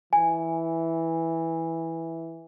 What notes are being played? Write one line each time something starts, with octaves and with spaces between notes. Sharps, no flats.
E3 G#5